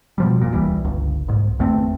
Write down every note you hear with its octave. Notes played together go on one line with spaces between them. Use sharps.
B2 F3 G3
F1 A#2
D#1 C2 E3 G3
G1 C#2
C2 G#2
G1 E2 A3 C4